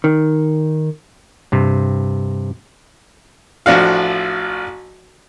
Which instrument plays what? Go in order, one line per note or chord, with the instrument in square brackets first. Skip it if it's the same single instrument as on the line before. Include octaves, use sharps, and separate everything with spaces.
[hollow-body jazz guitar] D#3
[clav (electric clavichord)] G2 C3
[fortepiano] A1 F3 D4 F#4 F5